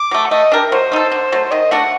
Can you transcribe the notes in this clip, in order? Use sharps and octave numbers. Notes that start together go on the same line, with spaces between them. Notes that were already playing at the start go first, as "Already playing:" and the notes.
Already playing: D6
F#3 A3
F#5
A3 D#5
D4 G4 A#4
F#3 C5
A3 D#4 A4
D3
F#3 A3
D#3 D#5
A3 D4 F#4 F#5